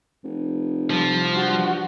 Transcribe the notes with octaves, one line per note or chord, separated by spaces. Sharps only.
F1
C2 F3 G3
G2 F#4